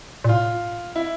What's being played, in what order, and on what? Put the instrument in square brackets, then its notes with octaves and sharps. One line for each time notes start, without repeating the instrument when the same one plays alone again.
[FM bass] A#2
[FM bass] A2 [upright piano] F4
[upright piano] E4